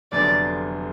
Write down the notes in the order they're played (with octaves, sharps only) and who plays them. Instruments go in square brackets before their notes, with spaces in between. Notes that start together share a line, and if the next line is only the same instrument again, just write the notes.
[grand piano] F1 F2 D3 F#3 B3 [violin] D5